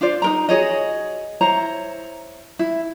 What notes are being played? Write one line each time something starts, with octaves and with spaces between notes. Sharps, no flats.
D4 F4 C5 D5
D#4 A#4 A#5
F#4 G#4 C#5 D#5
E4 C5 C#5 A#5
E4